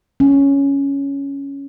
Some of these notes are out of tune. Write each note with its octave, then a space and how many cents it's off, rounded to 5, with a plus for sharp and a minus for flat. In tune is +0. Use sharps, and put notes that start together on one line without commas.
C#4 +5